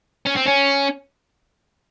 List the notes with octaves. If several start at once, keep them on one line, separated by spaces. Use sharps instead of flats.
C#4
C4
C#4